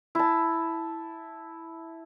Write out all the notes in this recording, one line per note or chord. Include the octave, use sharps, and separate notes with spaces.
E4 A5